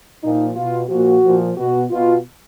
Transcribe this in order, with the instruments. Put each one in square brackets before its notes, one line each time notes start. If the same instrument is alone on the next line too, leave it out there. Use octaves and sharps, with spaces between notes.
[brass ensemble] A#2 F3 D#4
B2 F4
A#2 F3 F#4
A#2 F3
B2 F#4
B2 F4